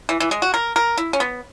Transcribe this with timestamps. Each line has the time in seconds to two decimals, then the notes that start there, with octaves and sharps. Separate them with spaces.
0.09 E3
0.20 E3
0.31 G#3
0.42 F#4
0.54 A#4
0.76 A#4
0.97 E4
1.13 C#4
1.20 B3